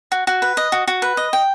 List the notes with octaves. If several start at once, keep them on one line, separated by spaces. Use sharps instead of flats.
F#4
F#4
B4
D#5
F#4
F#4
B4
D#5
G5